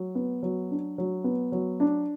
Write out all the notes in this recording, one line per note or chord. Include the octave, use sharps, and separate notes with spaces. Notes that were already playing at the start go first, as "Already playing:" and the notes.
Already playing: F#3
B3
F#3
D4
F#3
B3
F#3
D4